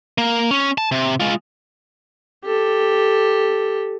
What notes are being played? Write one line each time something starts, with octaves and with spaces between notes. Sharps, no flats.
A#3
C#4
A5
C3
G#3 F4
G4 A4